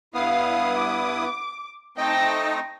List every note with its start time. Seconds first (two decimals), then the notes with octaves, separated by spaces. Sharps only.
0.14 G2 B3 E4 F5 D#6
0.77 D6
1.98 A3 C4 D#4 D#5 G5 A5 A#6